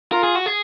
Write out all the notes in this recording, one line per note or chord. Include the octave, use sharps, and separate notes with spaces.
F4 A#4
G#4
F#4
G#4